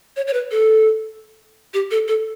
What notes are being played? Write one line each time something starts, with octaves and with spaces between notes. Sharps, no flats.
C#5
C#5
B4
A4
G4
A4
A4